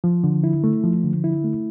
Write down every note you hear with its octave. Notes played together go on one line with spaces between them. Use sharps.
F3
D3
E4
A3
F3
D3
E4
A3